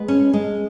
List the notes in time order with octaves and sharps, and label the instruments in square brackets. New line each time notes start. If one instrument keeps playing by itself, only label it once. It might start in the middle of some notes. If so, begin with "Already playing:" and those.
Already playing: [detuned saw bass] G#3 [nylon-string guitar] B3
[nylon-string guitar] C#4
G#3